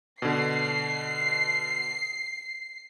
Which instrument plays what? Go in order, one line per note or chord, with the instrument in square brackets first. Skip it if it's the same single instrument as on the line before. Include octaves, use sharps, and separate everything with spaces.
[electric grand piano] B2 D3 [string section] C7